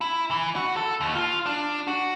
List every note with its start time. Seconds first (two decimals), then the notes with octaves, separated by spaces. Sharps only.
0.01 E4
0.31 E3
0.56 F#4
0.77 A4
1.01 D#2
1.15 F4
1.46 D4
1.87 F#4